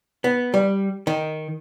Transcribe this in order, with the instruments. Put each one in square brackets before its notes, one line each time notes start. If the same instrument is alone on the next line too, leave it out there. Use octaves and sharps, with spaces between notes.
[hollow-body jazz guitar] B3
G3
D#3